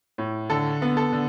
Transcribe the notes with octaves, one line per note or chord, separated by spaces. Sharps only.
A2
D3 A4
B3
A4
D3